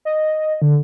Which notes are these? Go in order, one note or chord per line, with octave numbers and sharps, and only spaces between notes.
D#5
D3